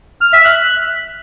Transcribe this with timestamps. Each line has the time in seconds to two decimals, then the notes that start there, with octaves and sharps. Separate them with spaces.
0.21 F6
0.33 E5
0.45 F#6